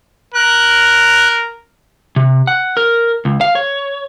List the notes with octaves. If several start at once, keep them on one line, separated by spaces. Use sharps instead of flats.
A#4 F#6
C3
F#5
A#4
C#2
F5
C#5